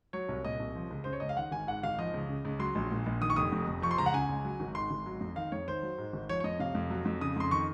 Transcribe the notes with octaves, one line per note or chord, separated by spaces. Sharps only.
F#3 C#5
C2
A#2 D#5
C2
F3
C#2
C#3 C5
C#5
C#2 D#5
F5
D#3 F#5
G#1 G#5
G#2 F#5
G#1 F5
F3 D#5
C#2
C#3
C#2
F#3 C6
A#1
A#2
A#1
D#3 D#6
C#6
F1 D#6
F2
F1
F3 C#6
C6
C#2 A#5
F#5
C#3 G#5
C#2
F#3
G#1
G#2 C6
G#1
F#3
F2
D#3 F5
F2 C#5
D#3 C5
F#3
G#2
G#1
F3 C#5
C#5
F2 D#5
C3 F5
F2
F#3
F2
C#3 D#6
F2 C6
D#3 C#6